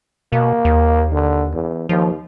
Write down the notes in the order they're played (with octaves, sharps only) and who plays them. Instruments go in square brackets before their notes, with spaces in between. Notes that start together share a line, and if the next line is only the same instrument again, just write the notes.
[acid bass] B2 [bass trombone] A#3
[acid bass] D#2
[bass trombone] D3
E2
[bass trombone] D#2 [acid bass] F3